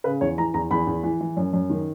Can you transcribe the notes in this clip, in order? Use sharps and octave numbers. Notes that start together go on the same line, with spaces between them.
C#3 B4
E2 C#5
E3 A#5
E2 A#5
E2 B5
E2
E3
E3
F#2
F#2
D#3